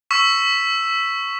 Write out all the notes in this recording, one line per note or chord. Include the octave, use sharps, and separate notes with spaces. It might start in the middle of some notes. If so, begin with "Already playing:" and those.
C#6 E6 B6 E7